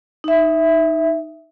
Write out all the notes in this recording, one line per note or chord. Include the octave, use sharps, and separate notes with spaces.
D#4 E5